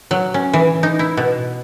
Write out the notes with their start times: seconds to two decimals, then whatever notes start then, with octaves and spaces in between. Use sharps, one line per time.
0.11 F#3
0.34 C#4
0.53 E3
0.83 D#4
0.99 E4
1.17 B2